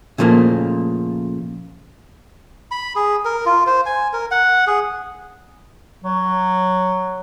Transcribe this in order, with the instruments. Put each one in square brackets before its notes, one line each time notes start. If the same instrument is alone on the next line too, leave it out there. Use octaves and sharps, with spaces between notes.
[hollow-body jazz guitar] A#2 C#3 F3 A3 A#3
[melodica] B5
G#4
A#4
F4
C5
G#5
A#4
F#5
G#4
[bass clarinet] F#3